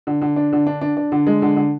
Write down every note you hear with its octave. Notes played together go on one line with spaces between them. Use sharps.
D3
D3
D4
D3
D4
D4
D4
D3
G#3
D3
D3